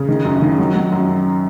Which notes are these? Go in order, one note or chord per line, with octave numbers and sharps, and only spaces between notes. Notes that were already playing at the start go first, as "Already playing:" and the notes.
Already playing: C#3
D#3
F#2
D#3
F#3
F#3
F#2